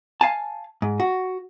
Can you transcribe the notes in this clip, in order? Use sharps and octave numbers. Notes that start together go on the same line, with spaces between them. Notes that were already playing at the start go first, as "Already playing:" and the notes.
F5 G#5 A5
G#2
F#4